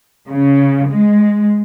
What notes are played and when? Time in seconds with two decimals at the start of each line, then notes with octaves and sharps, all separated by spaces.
0.29 C#3
0.88 G#3